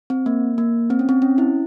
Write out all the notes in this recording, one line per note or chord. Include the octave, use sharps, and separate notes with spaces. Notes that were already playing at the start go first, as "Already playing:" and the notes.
C4
A#3
A#3
C4
C#4
C4
C#4
E4